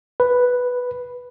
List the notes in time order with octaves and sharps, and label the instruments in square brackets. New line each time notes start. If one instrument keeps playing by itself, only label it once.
[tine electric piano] B4